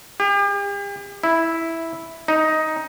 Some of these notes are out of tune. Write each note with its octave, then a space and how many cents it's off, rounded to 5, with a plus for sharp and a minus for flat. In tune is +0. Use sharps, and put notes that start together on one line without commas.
G4 +45
E4 -5
D#4 +10